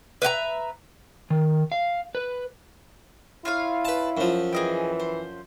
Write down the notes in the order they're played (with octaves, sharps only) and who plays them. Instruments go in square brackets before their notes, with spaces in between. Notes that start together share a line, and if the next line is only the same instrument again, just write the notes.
[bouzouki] B4 E5 G5 A#5
[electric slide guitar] D#3
F5
B4
[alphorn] E4 [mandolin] F4 C#5 F5
[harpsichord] B4 A5
F#2 F3
[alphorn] E3 [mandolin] G#4 D#5 G5
[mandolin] C5